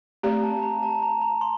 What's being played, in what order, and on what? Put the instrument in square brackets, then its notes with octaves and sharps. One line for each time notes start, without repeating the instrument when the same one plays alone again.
[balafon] A3 C4 G4 D5 [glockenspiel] A#5
[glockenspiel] A5
A#5
A5
A#5
A#5
C6